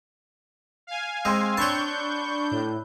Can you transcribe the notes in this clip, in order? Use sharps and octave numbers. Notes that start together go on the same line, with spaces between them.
F5 G#5
G#3 C4 C6
D4 B4 C#5 A5 C#6 G6
A2